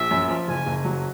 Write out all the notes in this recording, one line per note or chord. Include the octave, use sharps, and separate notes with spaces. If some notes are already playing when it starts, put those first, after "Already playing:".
Already playing: A#1 E5
F#2
F3
F#1 G#5
F#1
F#3